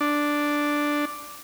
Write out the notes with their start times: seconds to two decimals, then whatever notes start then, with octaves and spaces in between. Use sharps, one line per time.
0.01 D4